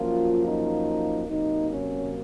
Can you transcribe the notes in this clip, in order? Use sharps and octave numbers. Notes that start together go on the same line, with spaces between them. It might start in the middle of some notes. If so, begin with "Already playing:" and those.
Already playing: F#2 F3 A#3 F4
D#4
C3 F#3 A#3 D#4
C#4